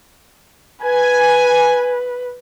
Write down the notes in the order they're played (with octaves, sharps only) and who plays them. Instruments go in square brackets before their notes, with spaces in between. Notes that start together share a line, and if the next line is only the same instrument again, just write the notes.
[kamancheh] B4 [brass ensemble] G#5